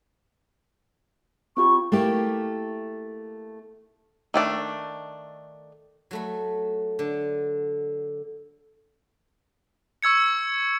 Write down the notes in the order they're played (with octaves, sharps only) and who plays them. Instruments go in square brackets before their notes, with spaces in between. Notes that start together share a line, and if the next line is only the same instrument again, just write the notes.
[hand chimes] C4 F4 G4 [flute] C#6
[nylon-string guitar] A3 A#3 E4 G4
[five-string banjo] D#3 A3 D4
[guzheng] F#3 A3 B5
D3
[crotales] C#6 E6 G#6 C#7